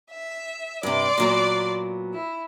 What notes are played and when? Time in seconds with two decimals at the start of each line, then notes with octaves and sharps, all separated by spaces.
0.10 E5
0.83 G2 C3 D5 C6
1.18 A#2 F#3 B3
2.14 E4